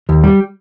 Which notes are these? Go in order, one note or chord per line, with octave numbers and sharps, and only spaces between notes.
D#2
G3